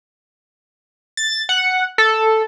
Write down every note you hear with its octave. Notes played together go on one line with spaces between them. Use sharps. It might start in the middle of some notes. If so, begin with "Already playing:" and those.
A6
F#5
A4